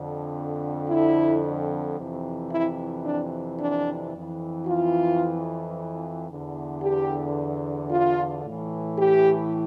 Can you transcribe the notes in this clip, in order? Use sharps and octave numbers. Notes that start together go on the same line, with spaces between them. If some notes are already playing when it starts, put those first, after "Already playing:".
Already playing: F2 D3
E4
F2 C3 E3
E4
D4
D4
F2 E3
F4
E2 D3
G4
F4
A2 E3
G4